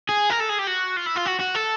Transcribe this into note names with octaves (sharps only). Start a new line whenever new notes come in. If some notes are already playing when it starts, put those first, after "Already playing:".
G#4
A#4
A4
G#4
G4
F#4
F4
E4
F4
F#4
F#4
A4